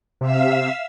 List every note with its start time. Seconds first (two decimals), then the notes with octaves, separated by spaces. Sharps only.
0.21 C3 E5 F5 E6